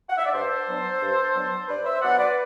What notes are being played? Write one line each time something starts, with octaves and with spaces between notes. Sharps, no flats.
F#5
E5
D5
G2 A4 C5
F#3 B3 D4
G2
F#3 B3 D4
G2 B4 D5
C5 E5
F#3 B3 D4 D5 F#5
B4 D5